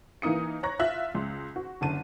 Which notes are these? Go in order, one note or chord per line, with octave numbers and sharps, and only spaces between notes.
E3 A#3 D#4 D#6 C#7
C#5 A#5 C#6 F#6 A#6
F4 E5 F#6 F#7
C#2 C6
F#4
F#1 D3 A5 D#7